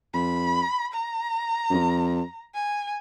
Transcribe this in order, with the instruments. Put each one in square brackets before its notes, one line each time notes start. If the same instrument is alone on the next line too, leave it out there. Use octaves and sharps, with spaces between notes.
[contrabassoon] F2 [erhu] B5
[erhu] A#5
[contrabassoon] F#2
F2
[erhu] G#5